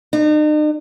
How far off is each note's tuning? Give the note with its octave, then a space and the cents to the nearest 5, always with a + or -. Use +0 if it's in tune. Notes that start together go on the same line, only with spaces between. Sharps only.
D#4 -45